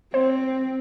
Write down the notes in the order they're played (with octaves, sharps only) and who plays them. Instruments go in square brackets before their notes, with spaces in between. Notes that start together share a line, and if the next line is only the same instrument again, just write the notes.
[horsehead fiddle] C4 [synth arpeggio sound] C5